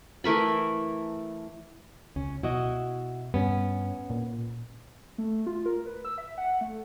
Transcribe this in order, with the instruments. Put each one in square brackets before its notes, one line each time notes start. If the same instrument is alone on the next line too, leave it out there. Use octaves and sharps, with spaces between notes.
[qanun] E3 A3 A#4 B5
[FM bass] C#2 [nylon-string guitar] C#4
[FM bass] B2 [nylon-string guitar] E4 F#4 D#5
[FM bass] G2 [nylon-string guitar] B3 C#4
[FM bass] A#2
[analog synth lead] A3
F4
A#4
B4
E6
E5
F#5
A3